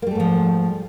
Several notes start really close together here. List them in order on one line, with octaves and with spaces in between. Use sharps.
A#3 G3 A3 G#2 F3